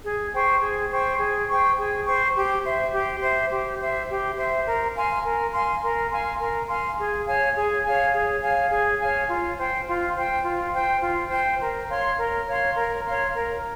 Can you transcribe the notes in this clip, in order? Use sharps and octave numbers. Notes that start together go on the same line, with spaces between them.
G#4
C5 G5 C#6
G#4
C5 G5 C#6
G#4
C5 G5 C#6
G#4
C5 G5 C#6
G4
C5 E5
G4
C5 E5
G4
C5 E5
G4
C5 E5
A#4
F5 G#5 C6
A#4
F5 G#5 C6
A#4
F5 G#5 C6
A#4
F5 G#5 C6
G#4
C#5 F5 G#5
G#4
C#5 F5 G#5
G#4
C#5 F5 G#5
G#4
C#5 F5 G#5
F4
C5 G5
F4
C5 G5
F4
C5 G5
F4
C5 G5
A#4
C#5 F5 C6
A#4
C#5 F5 C6
A#4
C#5 F5 C6
A#4